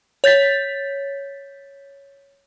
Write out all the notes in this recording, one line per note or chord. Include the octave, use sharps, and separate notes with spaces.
C#5 G6 A6 B6